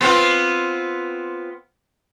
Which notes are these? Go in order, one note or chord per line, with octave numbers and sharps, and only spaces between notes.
B3 C4 F4